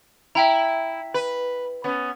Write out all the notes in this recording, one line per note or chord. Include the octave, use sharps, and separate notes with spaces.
E4 E5 G5 A#5
B4
B3 C#4